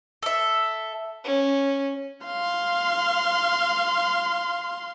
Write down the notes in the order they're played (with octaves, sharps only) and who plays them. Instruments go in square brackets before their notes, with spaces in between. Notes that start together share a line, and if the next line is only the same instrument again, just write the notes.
[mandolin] A4 E5
[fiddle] C#4
[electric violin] F5 C6